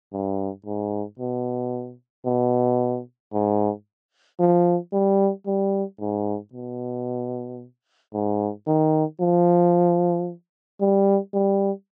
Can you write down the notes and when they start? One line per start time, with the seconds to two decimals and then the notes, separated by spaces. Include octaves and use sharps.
0.13 G2
0.66 G#2
1.19 B2
2.26 B2
3.33 G#2
4.40 F3
4.93 G3
5.46 G3
6.00 G#2
6.53 B2
8.13 G#2
8.67 D#3
9.20 F3
10.81 G3
11.34 G3